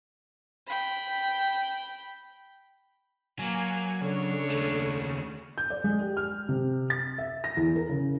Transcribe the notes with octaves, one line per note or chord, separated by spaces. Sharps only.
G5 B5
F#3 A#3 G#5
C#3 D4 A4 C#5
D#2 A3
G6
D5
G#3
G4
F6
C3
A6
E5
A#6
E2
A#4
C#3